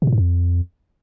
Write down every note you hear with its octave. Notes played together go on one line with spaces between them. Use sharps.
B2
A2
G2
F2